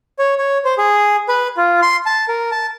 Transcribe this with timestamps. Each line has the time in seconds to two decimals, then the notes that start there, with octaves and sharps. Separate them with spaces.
0.19 C#5
0.38 C#5
0.65 C5
0.78 G#4
1.29 B4
1.57 F4
1.82 C6
2.06 A5
2.28 A#4
2.51 A5